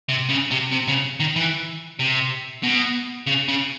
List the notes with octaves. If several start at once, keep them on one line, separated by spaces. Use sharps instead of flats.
C3
C#3
C3
C3
C#3
D#3
E3
C3
B2
C#3
C#3